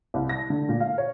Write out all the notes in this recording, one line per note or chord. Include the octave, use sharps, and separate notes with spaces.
C2
A#6
D3
A#2
F5
C#5